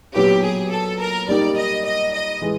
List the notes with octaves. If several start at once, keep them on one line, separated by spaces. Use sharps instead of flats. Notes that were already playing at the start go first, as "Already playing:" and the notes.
A#2 F#3 B3 G4
G#4
A4
A#4
G3 A#3 D#4 G4 D5
D#5
D#5
D#5
E3 G#3